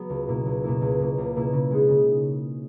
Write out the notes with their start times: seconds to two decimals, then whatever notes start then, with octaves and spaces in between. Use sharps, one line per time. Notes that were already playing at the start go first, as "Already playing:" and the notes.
Already playing: F#3 B3
0.09 C#2
0.28 B2 A#3 E4
0.46 C#2
0.64 B2 A#3 E4
0.81 C#2
0.99 B2 A#3 E4
1.18 C#2
1.36 B2 A#3 E4
1.53 C#3
1.71 G#3 D#4
1.89 C#3